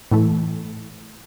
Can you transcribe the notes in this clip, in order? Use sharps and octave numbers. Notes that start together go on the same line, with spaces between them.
A2 E3 A3